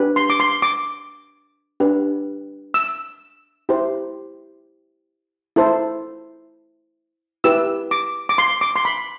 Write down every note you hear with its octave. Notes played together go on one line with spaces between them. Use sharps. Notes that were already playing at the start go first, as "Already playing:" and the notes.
Already playing: D4 G4 B4
C6
D6
C6
D6
D4 G4 B4
E6
E4 G4 C5
E4 A4 C5
E4 G4 B4 E6
D6
D6
C6
D6
C6
B5